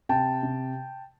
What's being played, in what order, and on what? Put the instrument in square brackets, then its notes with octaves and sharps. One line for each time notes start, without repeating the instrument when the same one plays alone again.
[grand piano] C3 G5 A5
C3